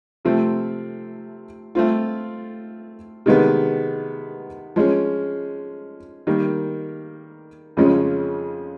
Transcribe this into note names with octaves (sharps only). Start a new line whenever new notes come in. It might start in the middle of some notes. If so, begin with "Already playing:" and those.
C3 F3 A3 C4
A3 C4 F4
C3 D#3 G#3 B3
F3 G#3 C#4
D#3 G3 A#3
F2 C#3 F3 G#3 C#4